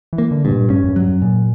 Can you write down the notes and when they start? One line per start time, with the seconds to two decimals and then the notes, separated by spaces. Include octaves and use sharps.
0.13 E3
0.18 A#3
0.31 D3
0.45 G2 B2
0.51 A#2
0.70 G2 C#4
0.84 F#2
0.89 G2
0.96 F#3
1.09 F#2
1.22 A#2